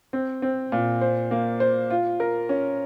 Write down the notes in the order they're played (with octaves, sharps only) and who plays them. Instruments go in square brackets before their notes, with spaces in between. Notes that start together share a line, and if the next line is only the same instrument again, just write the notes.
[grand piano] C4
C4
A#2
C5
A#3
C5
F4
A#4
C#4